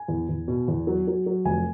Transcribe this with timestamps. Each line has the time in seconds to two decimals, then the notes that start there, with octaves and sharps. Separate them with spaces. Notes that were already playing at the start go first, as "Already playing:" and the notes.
Already playing: G#5
0.08 E2
0.29 E2
0.48 B2
0.68 E2
0.87 F#3
1.07 F#3
1.26 F#3
1.45 F1 G#5